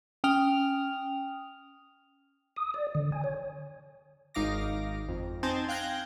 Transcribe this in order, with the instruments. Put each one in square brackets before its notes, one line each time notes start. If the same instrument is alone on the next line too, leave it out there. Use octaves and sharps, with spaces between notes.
[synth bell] C#4 G5 D#6 F6 F7
[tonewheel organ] D#6
D5
D3
G#5
C#5
[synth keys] G#1 D#4 F5 D6 A#6
F2
C4 D#4 C5 G#5 A5
F5 G5 F#6 G#6 A#6